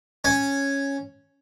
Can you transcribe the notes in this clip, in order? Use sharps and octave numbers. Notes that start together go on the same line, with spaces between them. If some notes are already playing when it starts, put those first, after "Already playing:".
C#4